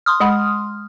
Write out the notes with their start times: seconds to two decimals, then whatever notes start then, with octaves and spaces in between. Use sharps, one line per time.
0.06 C6 D#6 F6
0.20 G#3 F#5 B5